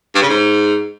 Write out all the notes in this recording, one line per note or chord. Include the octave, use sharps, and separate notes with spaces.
G2
C#3
G#2